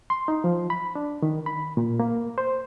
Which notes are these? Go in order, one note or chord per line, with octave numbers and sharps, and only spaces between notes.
C6
D#4
F3
B5
D4
D#3
B5
A#2
A#3
C5